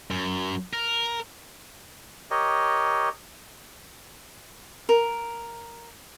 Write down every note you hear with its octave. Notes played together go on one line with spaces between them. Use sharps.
F#2
A#4
G4 A#4 C#5 D#5
A#4